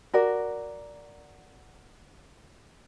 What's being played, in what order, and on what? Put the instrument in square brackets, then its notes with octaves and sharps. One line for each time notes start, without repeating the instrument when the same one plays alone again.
[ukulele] F#4 A#4 D5